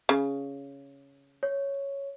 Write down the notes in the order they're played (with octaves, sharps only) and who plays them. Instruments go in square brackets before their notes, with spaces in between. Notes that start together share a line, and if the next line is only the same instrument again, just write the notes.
[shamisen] C#3
[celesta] C#5